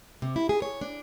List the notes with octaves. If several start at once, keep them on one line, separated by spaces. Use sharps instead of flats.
C3
E4
G#4
C#5
D4